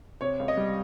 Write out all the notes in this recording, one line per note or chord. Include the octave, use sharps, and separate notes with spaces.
C3 C#5
C#2
D#5
G3